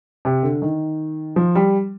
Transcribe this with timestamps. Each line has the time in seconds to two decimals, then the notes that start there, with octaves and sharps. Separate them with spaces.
0.25 C3
0.43 D3
0.62 D#3
1.36 F3
1.55 G3